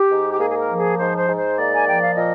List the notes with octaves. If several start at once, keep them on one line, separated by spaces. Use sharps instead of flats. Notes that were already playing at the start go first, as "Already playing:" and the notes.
Already playing: G4
G#2
G4
A#3 G#4
G#4
A#4
F3
G#4
G#2 C5
C5
G#2
C5
A#3 D5
G#5
F3 G5
F5
A#2 D#5